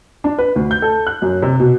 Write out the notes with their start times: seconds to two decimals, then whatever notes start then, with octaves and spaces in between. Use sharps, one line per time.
0.24 D4
0.38 B4
0.56 D2
0.71 G6
0.82 A4
1.07 F#6
1.22 F#2
1.42 C3
1.60 B2